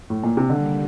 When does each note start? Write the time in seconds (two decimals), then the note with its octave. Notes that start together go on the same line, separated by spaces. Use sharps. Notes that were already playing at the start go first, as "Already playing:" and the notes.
0.10 A2
0.23 A#2
0.37 C3
0.49 D3 D#3 G3 A#3